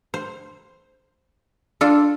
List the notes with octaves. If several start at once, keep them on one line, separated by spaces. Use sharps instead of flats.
C5
D4 F4 A4